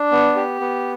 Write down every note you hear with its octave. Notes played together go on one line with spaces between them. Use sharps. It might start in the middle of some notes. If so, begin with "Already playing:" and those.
Already playing: D4
B3
G4
B3